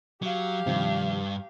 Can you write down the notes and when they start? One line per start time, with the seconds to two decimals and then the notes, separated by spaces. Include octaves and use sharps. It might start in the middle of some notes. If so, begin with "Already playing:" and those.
0.22 F#3 G4 F5
0.66 G2 C3 D#3 F3